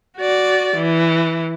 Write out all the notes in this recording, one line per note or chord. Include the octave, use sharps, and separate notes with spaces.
F#4 D5
E3